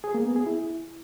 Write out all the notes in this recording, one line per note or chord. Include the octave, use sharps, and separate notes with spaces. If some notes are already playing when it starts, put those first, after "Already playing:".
G#4
A#3
B3
G#4
E4